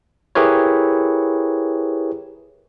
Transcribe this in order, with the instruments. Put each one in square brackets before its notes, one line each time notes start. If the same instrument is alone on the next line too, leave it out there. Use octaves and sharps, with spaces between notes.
[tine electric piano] E4 G4 G#4 A#4 B4 C#5